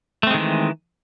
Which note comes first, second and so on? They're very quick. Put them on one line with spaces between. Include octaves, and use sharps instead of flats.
A3 C4 G#3 D#3 E3